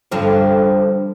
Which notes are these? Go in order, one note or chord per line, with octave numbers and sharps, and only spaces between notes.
G2 D3 F3